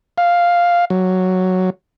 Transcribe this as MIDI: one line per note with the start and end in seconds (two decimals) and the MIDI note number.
0.18 0.85 77
0.90 1.70 54